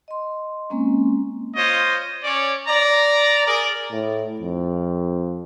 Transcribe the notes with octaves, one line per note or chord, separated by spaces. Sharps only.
D#5 C6
G#3 A#3 C4 C#4
F4 C5 C#5 D#5
C#4 C#5 D5
D5 A#5
G#4 A#4 D5
A2
F2